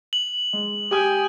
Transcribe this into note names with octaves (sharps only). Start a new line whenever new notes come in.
F#7
G#3
G4 G5 G#5 D#6